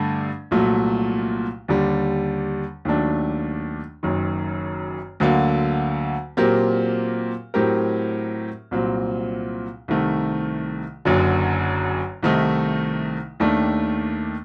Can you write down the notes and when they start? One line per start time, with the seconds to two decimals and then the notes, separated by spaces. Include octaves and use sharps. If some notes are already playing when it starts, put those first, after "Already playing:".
Already playing: G2 D3 A3 D4
0.51 C2 A#2 F#3 A3
1.68 D#2 D3 G3
2.85 D#2 D#3 F#3 A3 D4
4.03 F#1 F#2 D#3
5.20 D2 D3 F#3 A#3
6.37 A#2 F#3 C4 G4 A#4
7.54 A2 F#3 C4 G4 A#4
8.71 C2 A#2 F#3 C4
9.88 C2 C3 D#3 A3
11.05 F#1 F#2 D3 F#3
12.23 C2 C3 D#3 A3 D#4
13.40 D#2 D#3 A3 D4